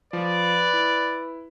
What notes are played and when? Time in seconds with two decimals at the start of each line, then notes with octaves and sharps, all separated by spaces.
0.13 F3 B4 D5
0.73 E4